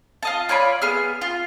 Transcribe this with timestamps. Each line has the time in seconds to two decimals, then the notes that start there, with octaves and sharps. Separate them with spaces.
0.23 F4 D#5 A5
0.49 F4 C#5 D5 B5
0.82 B3 G#4 F6
1.21 F4